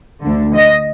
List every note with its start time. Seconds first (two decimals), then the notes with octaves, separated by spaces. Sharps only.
0.22 D2 D3
0.54 D#5